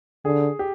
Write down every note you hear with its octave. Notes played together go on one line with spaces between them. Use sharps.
D3 G#4
G4